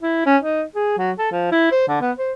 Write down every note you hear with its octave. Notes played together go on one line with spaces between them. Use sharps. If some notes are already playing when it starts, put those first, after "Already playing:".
E4
C#4
D#4
G#4
F#3
A4
F3
E4
C5
D3
B3
C5